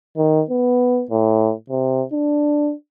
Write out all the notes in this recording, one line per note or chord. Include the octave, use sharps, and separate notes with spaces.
D#3
B3
A2
C3
D4